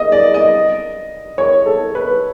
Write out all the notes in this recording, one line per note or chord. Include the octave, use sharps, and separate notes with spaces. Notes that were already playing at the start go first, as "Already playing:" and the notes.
Already playing: D#5
D5
D#5
C#5
A4
B4